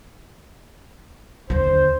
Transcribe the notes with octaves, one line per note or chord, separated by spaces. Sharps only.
D#2 D3 C5